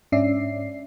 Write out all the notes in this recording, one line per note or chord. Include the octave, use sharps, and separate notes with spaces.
G#2 C#4 D4 D5 E5 C7